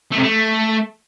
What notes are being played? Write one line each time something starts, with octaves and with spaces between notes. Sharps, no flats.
A3
C3
A3